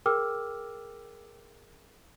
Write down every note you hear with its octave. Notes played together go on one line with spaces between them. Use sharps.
G#4 A#4 G5 D6 E6 F6